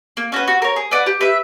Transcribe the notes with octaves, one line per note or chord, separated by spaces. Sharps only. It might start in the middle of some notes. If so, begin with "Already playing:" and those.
A#3
C#4 F#4 B4
F#4
A#4 C#5
G#4
B4 D5 F#5
G4
B4 E5